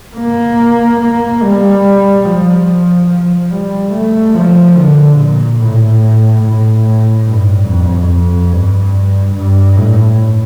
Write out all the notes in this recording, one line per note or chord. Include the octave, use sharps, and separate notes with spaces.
A#3
A#3
G3
F3
F3
G3
A3
F3
D3
A#2
A2
A2
G2
F2
F2
G2
G2
A2